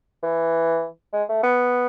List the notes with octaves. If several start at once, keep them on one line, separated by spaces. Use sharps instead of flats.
E3
G#3
A3
B3